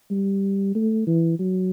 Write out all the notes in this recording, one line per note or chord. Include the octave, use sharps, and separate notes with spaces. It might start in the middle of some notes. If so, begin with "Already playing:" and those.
G3
A3
E3
F#3